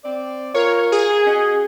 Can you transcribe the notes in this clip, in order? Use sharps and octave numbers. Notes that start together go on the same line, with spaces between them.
C4 D5
F4 A#4 C#5
G#4
C#4 F#4 D#5